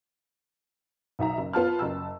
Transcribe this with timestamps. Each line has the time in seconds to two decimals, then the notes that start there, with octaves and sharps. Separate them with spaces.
1.19 B1 D#4 E5 A#5
1.38 F#1
1.53 B3 F4 A5 F6
1.79 F#1 A5 E6